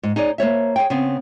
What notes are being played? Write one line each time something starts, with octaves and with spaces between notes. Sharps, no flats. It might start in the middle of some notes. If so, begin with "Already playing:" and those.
G#2
D#4 G#4 C#5 D5
A#3 C5 C#5 E5
G#4 C#5 G5
C#3 B3 C4